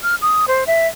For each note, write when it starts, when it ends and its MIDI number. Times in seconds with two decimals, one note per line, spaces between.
0.03 0.15 89
0.22 0.45 87
0.48 0.64 72
0.67 0.87 76